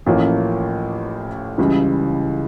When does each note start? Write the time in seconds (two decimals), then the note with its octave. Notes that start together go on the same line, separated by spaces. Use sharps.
0.06 A1 A2 F3 A#3 C#4
1.58 C#2 C#3 E3 G3